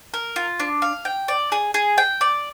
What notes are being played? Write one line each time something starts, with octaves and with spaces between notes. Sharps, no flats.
A#4
F4
D4
F5
G5
D5
G#4
G#4
G5
D5